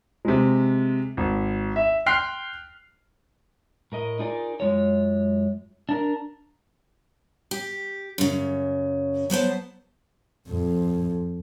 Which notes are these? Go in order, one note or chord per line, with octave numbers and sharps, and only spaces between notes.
C3 G#3
G#1
E5
G5 C6 F6 F#6 C7
A2 A#4 D#5
D#4 F4 G#4 A#4 D5
F#2 G#3 F4 C#5
D4 A#4
G4
F#2 C#3
F#3 B3 C5 A5
F2